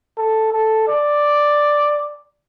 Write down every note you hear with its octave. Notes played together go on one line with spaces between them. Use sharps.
A4
A4
D5